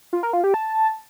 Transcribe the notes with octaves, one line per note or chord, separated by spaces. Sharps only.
F4
A#4
F4
G4
A5